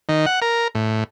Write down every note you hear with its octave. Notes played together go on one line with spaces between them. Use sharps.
D#3
F#5
A#4
A2